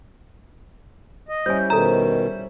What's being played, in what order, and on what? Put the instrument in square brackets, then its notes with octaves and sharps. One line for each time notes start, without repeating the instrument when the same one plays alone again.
[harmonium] D#5
[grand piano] G3 C#4 E4 [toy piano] C5 G#5 [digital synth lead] G6
[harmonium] B2 D#3 [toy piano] A4 A#5 [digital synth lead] C5